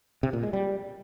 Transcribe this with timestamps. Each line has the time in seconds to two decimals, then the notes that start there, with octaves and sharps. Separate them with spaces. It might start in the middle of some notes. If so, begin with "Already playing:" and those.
0.23 C3
0.33 A#2
0.43 G#3
0.53 G3